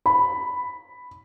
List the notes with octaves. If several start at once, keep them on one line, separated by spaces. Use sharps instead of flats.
B5